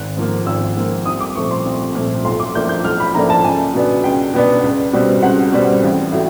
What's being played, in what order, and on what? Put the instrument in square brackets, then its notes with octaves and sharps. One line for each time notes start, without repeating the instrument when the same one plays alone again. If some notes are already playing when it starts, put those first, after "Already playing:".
Already playing: [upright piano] G#1 F#6
G#2 F3 A#3
G#1 E6
G#2 F3 A#3
C2 D#6
D6
A#2 F3 A3 C4 C#6
C6
C2
A#2 F3 A3 C4
B1 C6
D6
A2 F3 A#3 D4 G6
G6
B1 F6
B5
A2 F3 A#3 D4 A#5
A5
C#2 G#5
B2 F#3 B3 D4
C#2 G5
B2 F#3 B3 D4
C#2
B2 G3 C4
C#2 F#5
B2 G3 C4
A1
A2 F#3